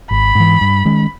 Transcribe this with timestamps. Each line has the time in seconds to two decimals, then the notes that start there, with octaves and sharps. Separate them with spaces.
0.11 G#1 B5
0.35 G#2 E3
0.61 G2
0.85 D#3 G#3 C#4